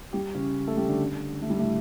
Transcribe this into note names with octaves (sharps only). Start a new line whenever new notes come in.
G3 G4
C#3 C#4
A3 A4
G3 G4
D3 D4
A3
G3
A2 A3